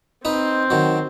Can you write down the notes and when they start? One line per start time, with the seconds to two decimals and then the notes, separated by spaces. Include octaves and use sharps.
0.25 C4 D#4 B4 C5
0.70 D#3 F#3